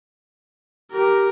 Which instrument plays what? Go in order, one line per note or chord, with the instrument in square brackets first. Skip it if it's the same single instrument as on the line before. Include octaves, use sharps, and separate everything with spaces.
[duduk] G4 [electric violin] A#4